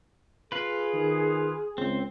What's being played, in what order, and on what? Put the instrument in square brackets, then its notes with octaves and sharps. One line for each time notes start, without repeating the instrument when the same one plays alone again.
[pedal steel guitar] F4 B4 [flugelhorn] G#4
[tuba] D#3
[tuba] C#2 [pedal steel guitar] C4